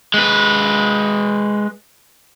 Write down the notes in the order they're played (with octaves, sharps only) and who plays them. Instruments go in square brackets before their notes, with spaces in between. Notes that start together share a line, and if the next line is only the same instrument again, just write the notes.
[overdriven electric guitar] G#3 B4